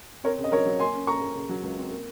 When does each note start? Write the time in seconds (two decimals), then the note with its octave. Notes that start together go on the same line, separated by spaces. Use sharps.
0.24 C4 A#4 C#5
0.38 C#3
0.44 D#5
0.52 F#3 A#4 C#5
0.66 F#3
0.80 A#3 G#5 C6
0.94 C#4
1.07 A#3 A#5 C#6
1.22 A#3
1.36 C#3
1.50 F#3
1.64 C#2
1.78 C4
1.91 A#3